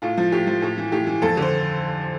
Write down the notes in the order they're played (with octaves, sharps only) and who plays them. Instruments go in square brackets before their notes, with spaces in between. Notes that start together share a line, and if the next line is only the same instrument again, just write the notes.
[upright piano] A2 F4
F3
A2 G4
F3
A2
E3
A2 G4
E3
F2 A4
D3 C5